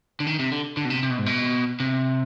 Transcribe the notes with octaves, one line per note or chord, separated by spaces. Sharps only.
D3
D#3
C3
D3
D3
B2
C3
C3
B2
G#2
B2
C3